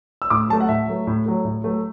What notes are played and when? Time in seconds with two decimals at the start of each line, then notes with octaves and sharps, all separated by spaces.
0.22 E6
0.30 A2 D6
0.49 F#3 A3 A5
0.60 F#5
0.68 A2 E5
0.88 F#3 A3
1.07 A2
1.26 F#3 A3
1.45 A2
1.64 F#3 A3